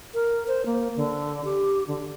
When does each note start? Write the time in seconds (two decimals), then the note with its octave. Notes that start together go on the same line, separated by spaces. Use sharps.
0.14 A#4
0.48 C5
0.66 A#3
0.96 D3
1.45 G4
1.88 D3